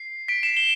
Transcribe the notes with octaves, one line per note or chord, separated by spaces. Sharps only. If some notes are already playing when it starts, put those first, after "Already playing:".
Already playing: C7
B6 D7
C7 E7
E7 G7